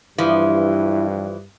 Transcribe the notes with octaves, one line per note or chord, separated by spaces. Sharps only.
G2 E3 F3 E4